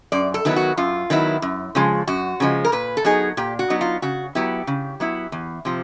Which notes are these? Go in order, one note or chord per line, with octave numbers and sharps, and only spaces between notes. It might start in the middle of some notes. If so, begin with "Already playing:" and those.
F#2 D5
A4
D#3 F#3 B3 E4
F#4
F#2 F4
D#3 F#3 B3 E4
F#2
C#3 F3 G#3
F#2 F#4
C#3 F3 G#3
A#4
A#2 B4
A4
F#3 B3 D#4 G#4
A#2 G4
F#4
F#3 B3 D#4
F4
C#3 F#4
F#3 B3 E4 G4
C#3
F#3 B3 E4
E2
C3 F3